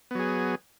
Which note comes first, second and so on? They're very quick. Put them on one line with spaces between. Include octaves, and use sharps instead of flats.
B3 F#3 G#4